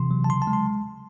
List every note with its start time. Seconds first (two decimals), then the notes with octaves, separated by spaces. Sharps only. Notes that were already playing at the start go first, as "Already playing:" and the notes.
Already playing: C3 E3 C6
0.11 F#3
0.24 A5
0.29 C#3 C6
0.42 A5
0.47 G#3
0.53 C6